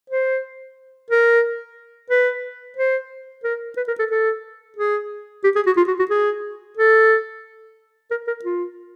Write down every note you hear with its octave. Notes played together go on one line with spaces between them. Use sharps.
C5
A#4
B4
C5
A#4
B4
A#4
A4
A4
G#4
G4
G#4
F#4
F4
F#4
F#4
G#4
A4
A#4
A#4
F4